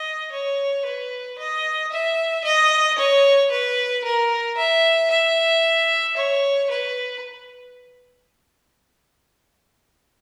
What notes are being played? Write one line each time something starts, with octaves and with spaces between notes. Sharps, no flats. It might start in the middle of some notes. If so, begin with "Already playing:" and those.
Already playing: D#5
C#5
B4
D#5
E5
D#5
C#5
B4
A#4
E5
E5
C#5
B4